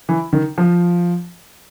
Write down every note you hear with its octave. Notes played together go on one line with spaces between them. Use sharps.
E3
D#3
F3